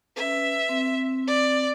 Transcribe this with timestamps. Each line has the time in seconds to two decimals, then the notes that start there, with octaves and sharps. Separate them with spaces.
0.16 C#4 B4 E5
0.69 C4
1.28 D5